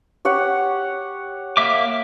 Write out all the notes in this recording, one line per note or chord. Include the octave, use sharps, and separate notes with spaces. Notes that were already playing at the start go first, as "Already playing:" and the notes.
G4 C#5 F#5
A#3 E5 D6